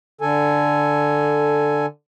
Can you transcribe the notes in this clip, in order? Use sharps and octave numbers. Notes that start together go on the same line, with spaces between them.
D3 A4 G#5